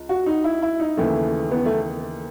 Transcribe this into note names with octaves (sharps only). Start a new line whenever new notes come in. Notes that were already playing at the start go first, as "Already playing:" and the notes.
Already playing: C#2
F#4
D#4
E4
E4
D#4
D#2 C#3 E3 A3
B3
A3